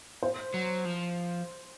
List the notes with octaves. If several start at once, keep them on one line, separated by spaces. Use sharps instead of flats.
C5
F#3
F3